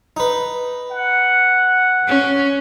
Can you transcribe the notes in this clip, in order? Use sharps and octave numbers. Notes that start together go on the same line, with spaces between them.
D#4 B4
F#5
C#4